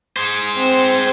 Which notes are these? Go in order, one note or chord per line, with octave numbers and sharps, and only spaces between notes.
G#4 C5
C4